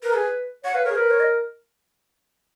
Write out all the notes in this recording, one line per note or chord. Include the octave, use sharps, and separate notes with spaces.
A#4 B4
G#4
C#5 F#5
B4 F5
A#4 C#5
G#4
A#4 B4
C#5
D#5